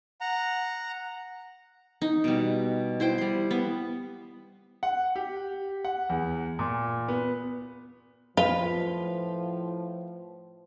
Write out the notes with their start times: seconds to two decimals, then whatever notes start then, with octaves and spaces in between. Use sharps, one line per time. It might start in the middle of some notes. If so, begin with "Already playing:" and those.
0.21 F#5 A#5
2.02 D#4
2.24 B2 G3
3.00 E4 C5 G5
3.18 G3 C6
3.51 B3
4.83 F#5
5.16 G4
5.85 F#5
6.09 E2
6.59 A#2
7.08 B3
8.37 A2 F3 F4 B4